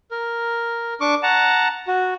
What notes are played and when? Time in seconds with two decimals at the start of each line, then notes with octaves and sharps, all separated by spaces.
0.11 A#4
1.01 D4 C#6 D6
1.23 F#5 A5 A#5
1.88 F#4